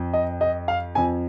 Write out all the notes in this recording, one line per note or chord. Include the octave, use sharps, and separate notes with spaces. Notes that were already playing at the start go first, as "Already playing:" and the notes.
Already playing: F2 F3
D#5
D#5
F5
F2 F3 G#5